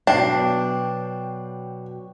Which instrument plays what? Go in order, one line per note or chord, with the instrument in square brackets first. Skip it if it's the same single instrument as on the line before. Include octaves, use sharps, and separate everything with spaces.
[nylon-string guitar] B2 F#3 [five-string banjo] D4 [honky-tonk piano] G5 C7